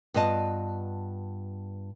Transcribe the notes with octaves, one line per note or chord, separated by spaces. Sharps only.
G2 B3 F4 D#5 A5